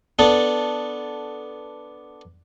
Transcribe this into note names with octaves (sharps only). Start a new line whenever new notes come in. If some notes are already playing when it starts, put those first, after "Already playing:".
B3 D4 A4